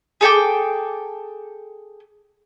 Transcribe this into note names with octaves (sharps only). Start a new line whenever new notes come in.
G#4 A4 G5 D6